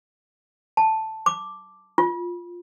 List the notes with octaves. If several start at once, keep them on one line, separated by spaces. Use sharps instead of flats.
A5
D6
F4